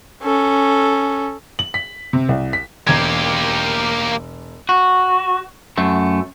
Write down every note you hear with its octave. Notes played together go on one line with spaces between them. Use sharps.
C#4 A4
F#7
B6
C3
C2
B6
E1 A#3 G4 G#6
F#4
F#2 A3